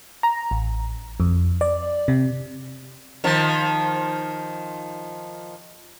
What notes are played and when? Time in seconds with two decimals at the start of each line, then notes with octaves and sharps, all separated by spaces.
0.23 A#5
0.51 A1
1.20 F2
1.61 D5
2.08 C3
3.24 D#3 F3